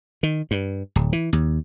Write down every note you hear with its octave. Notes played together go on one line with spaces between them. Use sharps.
D#3
G2
D1
E3
D#2